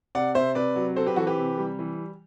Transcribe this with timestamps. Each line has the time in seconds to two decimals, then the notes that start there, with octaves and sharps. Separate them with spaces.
0.15 C3 D5 F#5
0.35 C3 C5 E5
0.55 C3 B4 D5
0.76 F#3
0.96 C4 A4 C5
1.07 G4 B4
1.16 E3 F#4 A4
1.27 G4 B4
1.38 C3
1.58 G3
1.79 E3